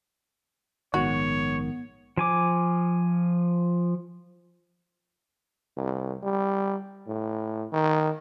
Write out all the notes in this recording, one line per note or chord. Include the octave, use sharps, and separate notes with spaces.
A#1 G#2 D#3 B3 F#4 C#5
F3 G#5 D6
C2
G3
A2
D#3